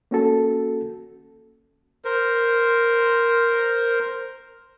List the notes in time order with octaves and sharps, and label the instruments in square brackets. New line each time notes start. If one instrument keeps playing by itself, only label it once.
[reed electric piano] A#3 C#4 F#4 A4
[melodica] A#4 C5